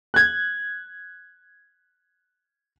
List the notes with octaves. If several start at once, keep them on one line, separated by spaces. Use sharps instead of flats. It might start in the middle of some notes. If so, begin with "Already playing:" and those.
F#6 G#6